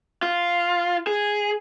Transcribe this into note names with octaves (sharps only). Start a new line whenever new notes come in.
F4
G#4